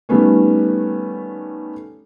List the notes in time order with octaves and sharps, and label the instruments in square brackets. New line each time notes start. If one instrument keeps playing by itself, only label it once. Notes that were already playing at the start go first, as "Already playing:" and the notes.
[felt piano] D#3 G3 A3 B3 C#4